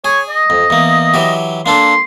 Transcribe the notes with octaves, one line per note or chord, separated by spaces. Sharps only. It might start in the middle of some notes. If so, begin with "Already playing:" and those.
G#4 C#5
D#5
F2
E2 A#3
E3 F#3 G4
A#3 D4 A4 C6